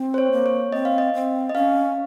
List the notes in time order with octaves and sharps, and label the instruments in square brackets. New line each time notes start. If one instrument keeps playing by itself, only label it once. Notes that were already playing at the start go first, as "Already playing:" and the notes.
Already playing: [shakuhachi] C4
[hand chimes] C5
C#5
[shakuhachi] A#3
[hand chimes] C#5
[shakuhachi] C4 [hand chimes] D#5
[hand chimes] F5
D#5
[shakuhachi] C4
[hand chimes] D#5
[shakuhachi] C#4 [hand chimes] F5